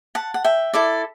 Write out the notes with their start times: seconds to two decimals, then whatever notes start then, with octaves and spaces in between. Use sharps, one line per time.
0.15 F#5 A5
0.34 F#5
0.44 E5 G5
0.74 E4 A4 D5